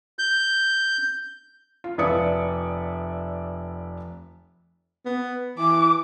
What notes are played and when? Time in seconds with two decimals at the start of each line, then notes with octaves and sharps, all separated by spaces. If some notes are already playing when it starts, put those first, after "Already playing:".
0.19 G6
1.84 F4
1.98 F1 B4 D5 E5 D#6 C#7
5.06 B3
5.58 E3 D6